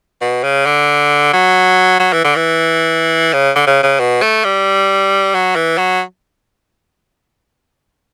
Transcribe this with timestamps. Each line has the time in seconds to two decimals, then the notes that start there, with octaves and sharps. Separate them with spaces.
0.21 B2
0.44 C#3
0.66 D3
1.33 F#3
2.00 F#3
2.13 E3
2.25 D3
2.36 E3
3.33 C#3
3.56 D3
3.67 C#3
3.83 C#3
4.00 B2
4.22 A3
4.45 G3
5.35 F#3
5.56 E3
5.78 F#3